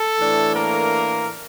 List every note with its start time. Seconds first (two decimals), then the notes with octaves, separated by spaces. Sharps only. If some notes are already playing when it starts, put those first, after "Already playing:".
Already playing: A4
0.20 A2 E3 A3 D4
0.55 A#3 A#4